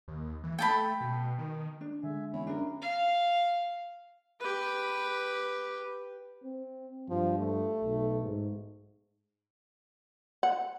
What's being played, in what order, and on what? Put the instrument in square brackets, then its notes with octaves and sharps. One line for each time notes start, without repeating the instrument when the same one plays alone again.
[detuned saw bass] D#2
E3
[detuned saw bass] A3 [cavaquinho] G5 A5 B5
[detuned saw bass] B2
D#3
[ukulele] D4
[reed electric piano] D3 G#3 [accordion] E5 G#5
[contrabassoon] E2 [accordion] C#4 E4
[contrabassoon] F#2 [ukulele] D4 A#4
[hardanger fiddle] F5
[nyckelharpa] G4 B4
[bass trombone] C4
[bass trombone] G2 [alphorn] F3
[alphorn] A3
[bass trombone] B1
G#2
[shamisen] F#5